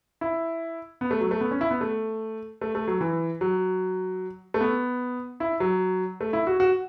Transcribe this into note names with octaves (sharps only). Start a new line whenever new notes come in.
E4
B3
A3
F#3
A3
B3
C#4
E4
B3
A3
A3
A3
F#3
E3
F#3
A3
B3
E4
F#3
A3
E4
F#4
F#4